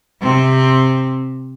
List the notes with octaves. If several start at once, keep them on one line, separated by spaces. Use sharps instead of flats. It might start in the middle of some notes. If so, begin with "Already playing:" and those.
C3 C4